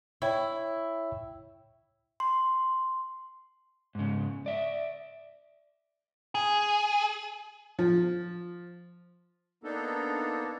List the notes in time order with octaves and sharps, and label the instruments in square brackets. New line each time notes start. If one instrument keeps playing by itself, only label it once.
[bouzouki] E4 [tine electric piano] C#5 E5 G5
[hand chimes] C6
[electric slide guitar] G#2 C#3
D5 E5
[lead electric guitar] G#4
[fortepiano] F3
[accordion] A#3 B3 D4 D#4 A4